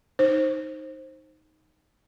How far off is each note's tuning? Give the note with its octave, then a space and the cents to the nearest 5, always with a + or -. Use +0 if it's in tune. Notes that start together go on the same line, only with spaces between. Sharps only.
D#4 +0 C5 +15